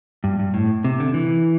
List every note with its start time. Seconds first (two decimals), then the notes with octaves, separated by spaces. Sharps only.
0.24 G2
0.39 G2
0.54 A2
0.84 C3
1.00 D3
1.14 E3